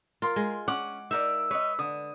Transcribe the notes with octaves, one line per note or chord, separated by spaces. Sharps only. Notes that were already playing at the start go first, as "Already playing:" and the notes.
F4 A#4 C6
G#3
C#4 F#5 D6
D#4 A#4 D5 E5 E6
B4 C#5 D#5
D3 D#6